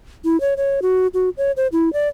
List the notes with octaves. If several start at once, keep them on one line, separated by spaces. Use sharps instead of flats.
E4
C#5
C#5
F#4
F#4
C#5
C5
E4
D5